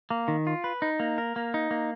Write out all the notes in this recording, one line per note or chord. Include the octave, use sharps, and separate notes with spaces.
A#3
D#3
F4
B4
D#4
A#3
A#4
A#3
D#4
A#3